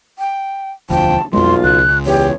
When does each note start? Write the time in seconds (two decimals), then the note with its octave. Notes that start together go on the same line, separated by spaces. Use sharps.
0.19 G5
0.90 E1 D2 F3 G5 A5
1.33 B1 F2 G#3 F4 C6
1.64 C#2 F#6
2.06 E2 G4 C#5